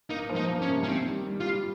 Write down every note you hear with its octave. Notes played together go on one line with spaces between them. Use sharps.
A#3 D#4
F3
D#4
A#3
C#4
C3
C#4
D#3 C4
G3
G3
F4
G3